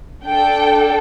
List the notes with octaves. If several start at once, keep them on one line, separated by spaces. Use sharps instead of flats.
D4 A4 G5